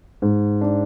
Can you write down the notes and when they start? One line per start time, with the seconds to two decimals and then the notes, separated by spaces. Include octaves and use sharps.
0.22 G#2
0.61 D4